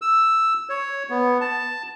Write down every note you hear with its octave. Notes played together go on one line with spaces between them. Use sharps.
E6
C#5
B3
A5